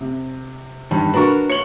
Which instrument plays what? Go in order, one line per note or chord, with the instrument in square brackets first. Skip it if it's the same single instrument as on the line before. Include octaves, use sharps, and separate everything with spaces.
[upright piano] C3
[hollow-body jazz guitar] E2 G2 D#3
[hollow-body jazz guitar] D4 F#4 A#4 [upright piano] B4 A#5 C#6
[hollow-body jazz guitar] C#5 [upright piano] C#7 F#7 G7